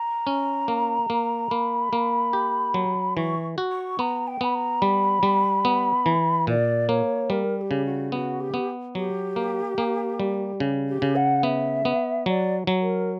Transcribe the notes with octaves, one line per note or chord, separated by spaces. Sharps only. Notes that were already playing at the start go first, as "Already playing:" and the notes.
Already playing: A#5
C#4
A#3
A#3
A#3 B5
A#3
G4
F#3
E3 C#6
F#4
C#6
B3 A#5
G5
B3 B5
A#5
G3 B5
G3
B3
E3
A#2 D5
A#3 C#5
G3 A#4
A#4
G4
C#3
F#4
B3 F#4
G4
B3
F#3 G4
A#3
A#3
G3
C#3
G4
C#3
F#5
B3 E5
B3
F#3 D5
F#3
A#4